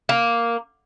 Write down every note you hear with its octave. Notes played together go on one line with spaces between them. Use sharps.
A#3